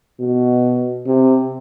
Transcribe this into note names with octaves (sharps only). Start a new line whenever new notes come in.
B2
C3